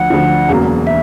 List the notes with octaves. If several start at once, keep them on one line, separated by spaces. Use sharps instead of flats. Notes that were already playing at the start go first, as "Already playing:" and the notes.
Already playing: D2 D3 F3 F#5
D2 D3 F3
E1 E2 C#3 F#3 A#3
E5